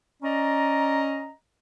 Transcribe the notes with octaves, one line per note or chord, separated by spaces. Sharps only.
C#4 D5 D#5 A#5